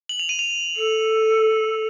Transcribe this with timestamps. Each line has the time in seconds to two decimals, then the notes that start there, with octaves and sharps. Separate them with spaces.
0.09 F#7
0.19 F7
0.29 D#7
0.39 F7
0.76 A4